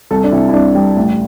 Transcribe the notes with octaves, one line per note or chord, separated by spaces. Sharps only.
C2 A4
D4
C3 E4
E4
C2 D4
G3
A1